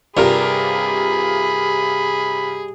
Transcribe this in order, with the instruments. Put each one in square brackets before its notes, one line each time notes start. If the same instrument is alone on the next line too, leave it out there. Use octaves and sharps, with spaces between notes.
[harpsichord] G2 [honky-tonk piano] C3 F4 A#4 [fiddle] G#4 [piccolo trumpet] B5